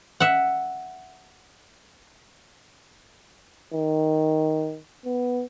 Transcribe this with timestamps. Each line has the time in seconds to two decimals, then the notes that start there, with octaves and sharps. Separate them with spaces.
0.20 E5 F#5
3.74 D#3
5.05 B3